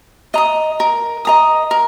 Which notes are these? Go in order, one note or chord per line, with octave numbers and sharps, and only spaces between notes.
D#5 A#5 D#6
A#4
D#5 A#5 D#6
A#4